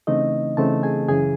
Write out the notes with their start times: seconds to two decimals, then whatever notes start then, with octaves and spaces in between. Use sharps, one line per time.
0.07 C#3 E3 A3 C4 D#4 D#5
0.57 C#3 E3 A3 C4 A4 A5
0.83 G#4 G#5
1.08 F#2 C#3 E3 G#4 G#5